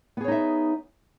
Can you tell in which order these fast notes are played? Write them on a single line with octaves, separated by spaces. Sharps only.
B3 G#4 C#5 D#4 E5